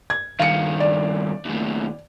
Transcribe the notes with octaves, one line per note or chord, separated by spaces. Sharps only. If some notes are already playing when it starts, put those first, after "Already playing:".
G#6
G2 D#3 F5 C#7
D5
D#2 A2